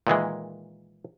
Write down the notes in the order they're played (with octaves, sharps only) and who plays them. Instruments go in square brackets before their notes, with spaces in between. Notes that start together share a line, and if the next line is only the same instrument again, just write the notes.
[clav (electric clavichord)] A#2 D#3 E3 G#3